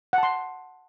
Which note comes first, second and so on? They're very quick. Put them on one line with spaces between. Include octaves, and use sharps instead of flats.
F#5 A5 C6